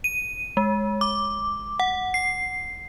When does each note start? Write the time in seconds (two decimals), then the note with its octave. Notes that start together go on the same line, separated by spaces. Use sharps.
0.04 D#7
0.57 G#3
1.01 D6
1.80 F#5
2.14 C7